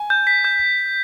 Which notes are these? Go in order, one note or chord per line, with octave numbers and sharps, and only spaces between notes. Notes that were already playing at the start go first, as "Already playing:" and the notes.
Already playing: G#5
G6
B6
G6